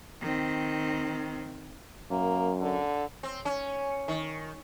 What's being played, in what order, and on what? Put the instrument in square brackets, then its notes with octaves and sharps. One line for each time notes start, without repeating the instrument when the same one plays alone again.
[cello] D#3 C4
[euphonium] F#2 [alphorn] A#3
[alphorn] D3
[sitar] C4
C#4
D#3